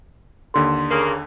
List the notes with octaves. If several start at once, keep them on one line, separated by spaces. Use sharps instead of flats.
D#2 D3 A4 C6
C#3 A#3